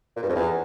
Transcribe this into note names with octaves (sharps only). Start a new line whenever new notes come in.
A#2
G2
F2
E2